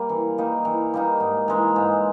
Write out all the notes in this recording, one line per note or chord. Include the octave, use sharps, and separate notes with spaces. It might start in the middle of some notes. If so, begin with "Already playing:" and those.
Already playing: G3 A#3
E3
G3 A#3 D#4
E3
G3 A#3 D#4
G#2
E3 G#3 D#4
G#2